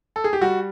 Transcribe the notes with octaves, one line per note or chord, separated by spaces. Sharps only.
A4
G#4
G4
G3 F#4